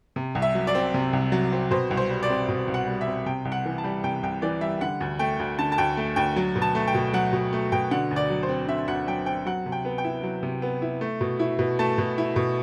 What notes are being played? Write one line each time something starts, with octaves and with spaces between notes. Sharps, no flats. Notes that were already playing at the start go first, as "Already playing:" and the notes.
C3
C2
E5
F#3
D5
C4
C3
C2
F#3
C4
B2 C5
C2
C5
G3
D5
C4
B2
C2
F#5
G3
E5
C4
C3 G5
C2
F#5
E3
A5
G3
C3 G5
C2 G5
E3 D5
G3 E5
D3 F#5
D2
A3 G5
D2
D3 A5
A5
D2 G5
A3
D2 G5
F#3
B2
A5
A3
G5
B2
F#3 F#5
B2
A3
B2 G5
D3 F#5
D2
D5
F#3
C5
C4
D3 E5
D2 F#5
F#3 G5
C4 G5
F#3 F#5
C3
G5
B3
G5
E4
F#3
C3
B3
E4
A3
B2
E4
B2
A3 A5
B2
E4
B2